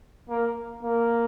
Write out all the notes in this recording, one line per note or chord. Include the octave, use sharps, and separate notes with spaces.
A#3
A#3